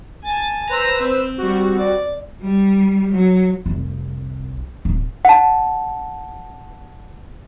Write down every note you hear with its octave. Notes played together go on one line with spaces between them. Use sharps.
G#5 A5
B4 C5 A#5 E6
C4
G3 F#4
D5
G3
F#3
F1 C2
D1
F#5 A5